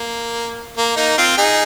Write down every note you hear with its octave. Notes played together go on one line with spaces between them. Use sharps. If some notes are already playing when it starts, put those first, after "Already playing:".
Already playing: A#3
A#3
A#3 D#4
C4 F4
D#4 G#4